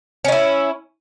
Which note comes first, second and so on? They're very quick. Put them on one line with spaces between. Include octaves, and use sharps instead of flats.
C#4 D#4 E4